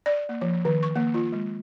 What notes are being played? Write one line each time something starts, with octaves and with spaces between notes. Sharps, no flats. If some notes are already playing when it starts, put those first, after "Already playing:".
D5
A#3
F3
D#3
C#6
A#3
F4
G#3